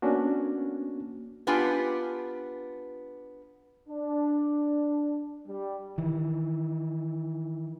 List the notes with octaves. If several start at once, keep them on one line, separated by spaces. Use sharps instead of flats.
A#3 B3 C#4 D4 F#4
B3 D4 F4 G4 B4 G#5
D4
G3
D#3 E3